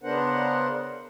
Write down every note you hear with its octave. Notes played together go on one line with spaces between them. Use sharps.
C#3 B3 D4 A#4 C5 F#5